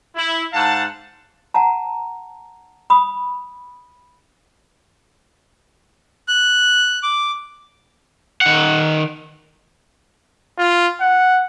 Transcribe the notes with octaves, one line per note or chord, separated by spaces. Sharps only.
E4
G#2 F5 F#5 A5
F#5 A5 A#5
B5 D#6
F#6
D6
D#3 F#5
F4
F#5